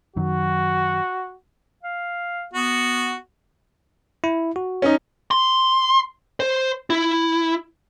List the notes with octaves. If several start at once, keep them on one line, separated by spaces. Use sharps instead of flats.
F#2 D#3 F#3 F#4
F5
B3 F#4
E4
F#4
C#4 D#4
C6
C5
E4